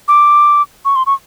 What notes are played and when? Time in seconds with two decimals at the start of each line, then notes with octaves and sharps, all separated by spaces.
0.08 D6
0.85 C#6
0.96 C6
1.06 C#6